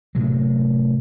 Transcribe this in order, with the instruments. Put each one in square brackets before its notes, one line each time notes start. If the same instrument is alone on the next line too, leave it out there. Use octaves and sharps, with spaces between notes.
[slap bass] A2 C3 F#3